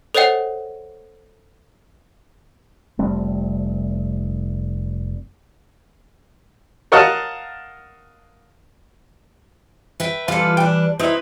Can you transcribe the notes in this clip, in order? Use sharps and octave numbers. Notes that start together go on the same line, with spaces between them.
A4 C5 C#5 D#5 F#5 G5
F1 G3 A3 C4
A#4 C#5 D#5 F5 F#5 A5
B4 E5 G5
E3 G3 F4 A4 B4
D4 G5
C4 D#4 E4 B4